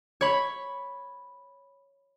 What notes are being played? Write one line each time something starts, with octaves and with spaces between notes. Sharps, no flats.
C#5 B5